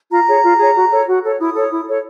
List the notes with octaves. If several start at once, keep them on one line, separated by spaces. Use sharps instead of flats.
F4 A#5
G#4 C#5
F4
G#4 C#5
F#4
A4 C#5
F#4
A4 C#5
E4 D#6
A4 C#5
E4
A4 C#5